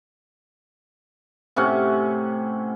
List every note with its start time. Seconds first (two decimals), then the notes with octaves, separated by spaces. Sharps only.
1.56 A2 C3 C#4 F#5